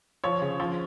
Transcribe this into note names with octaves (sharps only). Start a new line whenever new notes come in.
F3 C#5
C#3
F3